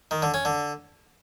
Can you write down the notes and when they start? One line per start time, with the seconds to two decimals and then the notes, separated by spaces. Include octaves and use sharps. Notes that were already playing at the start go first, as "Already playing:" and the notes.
0.11 D#3
0.22 D3
0.34 C#4
0.45 D3